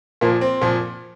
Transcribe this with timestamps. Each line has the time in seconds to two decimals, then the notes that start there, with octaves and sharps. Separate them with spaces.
0.21 A#2 F3 A#3
0.41 C4
0.61 A#2 F3